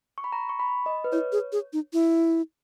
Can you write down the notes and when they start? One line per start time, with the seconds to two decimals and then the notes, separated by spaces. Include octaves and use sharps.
0.18 C#6
0.24 B5
0.33 A#5
0.49 C#6
0.59 B5
0.86 D#5
1.04 B4
1.12 E4 C#5
1.32 G#4
1.52 G#4
1.73 D#4
1.93 E4